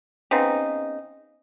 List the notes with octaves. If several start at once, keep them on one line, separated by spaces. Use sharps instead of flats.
C#3 B3 C4 D#4